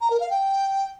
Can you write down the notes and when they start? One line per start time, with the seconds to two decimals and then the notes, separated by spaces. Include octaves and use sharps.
0.01 A#5
0.10 A#4
0.20 F5
0.30 G5